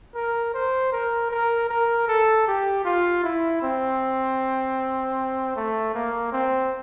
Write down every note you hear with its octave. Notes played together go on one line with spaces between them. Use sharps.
A#4
C5
A#4
A#4
A#4
A4
G4
F4
E4
C4
A3
A#3
C4